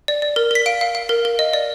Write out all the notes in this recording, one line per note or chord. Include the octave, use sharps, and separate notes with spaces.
D5
D5
A#4
A#4 B6
F5 D7
F5
F5
A#4
A#4
D#5
D5